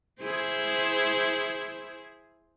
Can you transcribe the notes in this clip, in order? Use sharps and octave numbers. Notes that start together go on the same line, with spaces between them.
E4 G#4 C5